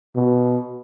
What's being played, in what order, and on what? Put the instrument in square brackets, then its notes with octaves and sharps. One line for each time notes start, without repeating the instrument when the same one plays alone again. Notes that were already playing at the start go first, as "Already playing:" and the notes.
[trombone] B2